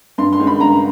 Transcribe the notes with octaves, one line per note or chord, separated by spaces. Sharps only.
G2 C6
C6
D#3 G#3 C#4
B5
G2 A#5